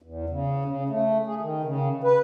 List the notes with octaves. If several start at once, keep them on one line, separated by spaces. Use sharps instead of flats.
E2
C#3
C#3
A3
G#4
D#3
C#3
B4